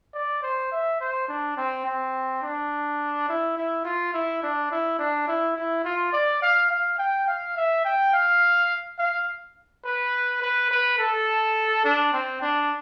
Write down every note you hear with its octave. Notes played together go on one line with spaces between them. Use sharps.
D5
C5
E5
C5
D4
C4
C4
D4
E4
E4
F4
E4
D4
E4
D4
E4
E4
F4
D5
F5
F5
G5
F5
E5
G5
F5
F5
B4
B4
B4
A4
D4
C4
D4